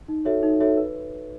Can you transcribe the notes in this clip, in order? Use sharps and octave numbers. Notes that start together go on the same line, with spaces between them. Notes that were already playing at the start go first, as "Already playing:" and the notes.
D#4
F#4 A4 C#5 E5
D#4
F#4 A4 C#5 E5
B4